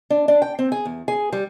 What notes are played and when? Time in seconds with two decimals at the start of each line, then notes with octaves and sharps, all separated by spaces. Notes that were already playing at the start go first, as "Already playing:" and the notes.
0.10 D4
0.28 D4
0.42 G5
0.59 C4
0.72 G#4
0.85 E2
1.08 G#4
1.33 G3